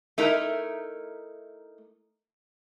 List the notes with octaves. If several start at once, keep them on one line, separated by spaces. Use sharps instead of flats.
A3 D#4 E4 A#4